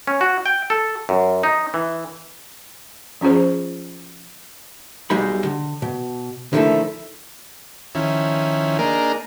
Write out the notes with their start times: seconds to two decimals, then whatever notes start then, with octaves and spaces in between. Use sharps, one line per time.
0.07 C#4
0.21 F#4
0.46 G5
0.70 A4
1.09 F#2
1.43 D#4
1.74 E3
3.21 F3 C#4 F4 G#4 C5
5.10 B1 G3 G#3 D#4 B5
5.45 D3
5.82 B2
6.53 D3 D#3 F3 A3 D#4 E4
7.95 D#3 F3 C#4 E4
8.79 A#3 D4 D#4 G#4 A#4